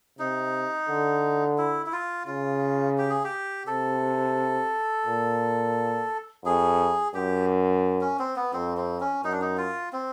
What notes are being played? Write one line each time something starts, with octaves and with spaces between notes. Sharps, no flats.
C3 D#4
D3
E4
E4
F4
C#3 F4
G4
G#4
G4
C3 A4
A#2
F2 G#4
F#2 G4
C#4
C4
B3
F2 C4
C4
C#4
F#2 D#4
D4
D#4
F4
C4